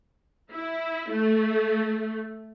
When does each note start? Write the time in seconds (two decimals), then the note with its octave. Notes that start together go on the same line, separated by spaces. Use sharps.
0.52 E4
1.12 A3